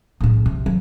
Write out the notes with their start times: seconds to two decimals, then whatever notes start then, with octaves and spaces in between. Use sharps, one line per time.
0.21 A2 C#3
0.46 C3
0.66 F#3